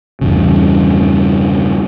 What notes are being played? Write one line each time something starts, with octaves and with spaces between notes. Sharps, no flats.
E2 G2 C#3